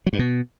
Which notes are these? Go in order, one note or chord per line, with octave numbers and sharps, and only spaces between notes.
F#3
G2
B2